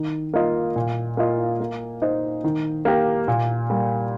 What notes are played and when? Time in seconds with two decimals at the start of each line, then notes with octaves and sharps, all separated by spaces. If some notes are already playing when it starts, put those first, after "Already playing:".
Already playing: D#3
0.34 A#3 F4 D#5
0.76 A#2
1.17 A#3 F4 D#5
1.60 A#3
2.02 D#4 C5 D#5
2.44 D#3
2.85 A#3 G4 A#4
3.28 A#2
3.70 G3 A#3